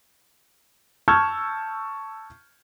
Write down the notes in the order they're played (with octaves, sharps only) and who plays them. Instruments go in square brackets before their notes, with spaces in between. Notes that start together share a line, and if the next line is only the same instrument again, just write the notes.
[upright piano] A5 C#6 E6 F6 G6 G#6